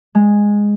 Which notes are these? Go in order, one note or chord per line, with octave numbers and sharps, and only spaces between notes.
G#3